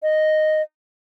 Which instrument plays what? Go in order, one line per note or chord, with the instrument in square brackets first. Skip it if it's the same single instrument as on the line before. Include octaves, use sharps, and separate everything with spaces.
[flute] D#5